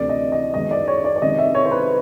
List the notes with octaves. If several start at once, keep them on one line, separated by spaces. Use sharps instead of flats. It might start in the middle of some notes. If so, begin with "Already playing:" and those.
Already playing: D2 C3 E3 D5
D#5
D#5
F#2 D#3 G#3 B3 D#5
D5
C#5
D5
D5
C3 D#3 G#3 C#4 D#5
E5
C#5
C5
B4